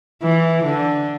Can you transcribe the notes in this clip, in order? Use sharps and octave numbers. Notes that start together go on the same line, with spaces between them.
E3
D3